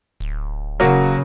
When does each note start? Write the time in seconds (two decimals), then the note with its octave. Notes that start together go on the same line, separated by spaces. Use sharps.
0.20 D1
0.80 C#3 F#3 A#3 F#4